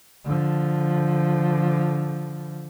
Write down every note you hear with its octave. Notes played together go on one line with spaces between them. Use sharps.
D3 F3